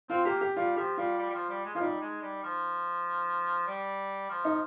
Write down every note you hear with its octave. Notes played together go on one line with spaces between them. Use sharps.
C4 F4
A#3 G4
G4
G3 F4
F3 G4
G3 F4
G3
G3
F3
G3
G#3
F3 F4
G3 D#4
G#3
G3
F3
G3
F3
D#4